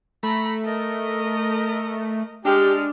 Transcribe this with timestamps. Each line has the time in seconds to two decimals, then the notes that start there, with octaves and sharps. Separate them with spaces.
0.23 A3 A#5 B5
0.64 A#4 D#5
2.45 G#3 D4 G4 F6